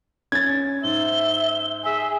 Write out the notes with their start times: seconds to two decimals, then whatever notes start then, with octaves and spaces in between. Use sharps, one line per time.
0.32 C#4 G#6 A6
0.84 G#2 E5 G7
1.84 G#4 E5